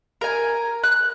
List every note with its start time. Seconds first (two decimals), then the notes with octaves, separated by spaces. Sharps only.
0.21 A#4 G#5
0.83 F#6